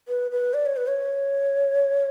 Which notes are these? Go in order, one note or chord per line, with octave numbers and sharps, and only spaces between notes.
B4
B4
D5
C#5
B4
C#5